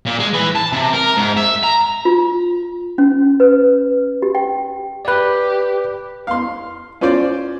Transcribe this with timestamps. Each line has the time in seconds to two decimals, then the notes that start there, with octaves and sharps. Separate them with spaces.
0.06 A#2
0.20 G#3
0.33 E3
0.56 A5
0.73 C3
0.93 A#4
1.17 G#2
1.37 E5
1.64 A#5
2.05 F4
2.98 C#4
3.40 B4
4.22 G4
4.35 G5
5.05 G4 B4 D5
6.27 F5 C6
7.01 C#4 F4 C5 D5